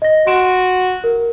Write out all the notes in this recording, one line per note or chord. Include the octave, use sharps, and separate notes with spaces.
D#5 A#6
F#4 C6 D7 E7
A#4